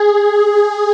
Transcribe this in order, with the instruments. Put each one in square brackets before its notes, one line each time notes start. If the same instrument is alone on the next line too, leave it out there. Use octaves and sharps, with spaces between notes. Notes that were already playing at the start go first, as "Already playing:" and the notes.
Already playing: [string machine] G#4